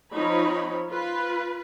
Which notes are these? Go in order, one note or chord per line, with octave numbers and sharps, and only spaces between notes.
F3 C4 D#4 C#5 B5
F4 B4